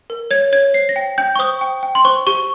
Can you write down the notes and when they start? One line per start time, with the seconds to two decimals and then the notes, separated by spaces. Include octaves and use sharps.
0.10 A#4
0.31 C#5 G#6
0.53 C#5 G#6
0.74 C5 C7
0.89 A#6
0.96 G5
1.18 G5 G6
1.36 C#6
1.39 C5 D#6
1.61 G5
1.83 G5
1.95 C6
2.05 C5 C#6
2.27 G4 C#6